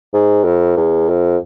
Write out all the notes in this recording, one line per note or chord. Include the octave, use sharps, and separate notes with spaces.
G#2
F2
E2
F2